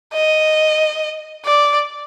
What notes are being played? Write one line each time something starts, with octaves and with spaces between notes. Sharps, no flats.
D#5
D5